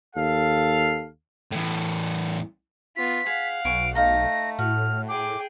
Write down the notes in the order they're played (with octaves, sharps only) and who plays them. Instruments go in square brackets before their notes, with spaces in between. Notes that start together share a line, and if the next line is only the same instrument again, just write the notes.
[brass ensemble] D#2 A4 F5
[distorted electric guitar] E2 A2
[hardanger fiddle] B3 F4 [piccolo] B6
[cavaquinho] G#4 [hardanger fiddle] F5 F#5
[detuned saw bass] B1 [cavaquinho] B4 G#5 C#6 [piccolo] D7
[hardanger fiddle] A3 [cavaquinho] D#4 F5 A#5 [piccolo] A#6
[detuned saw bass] A2 [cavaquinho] F#4 [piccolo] F6
[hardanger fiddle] G#4 G5 [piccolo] D6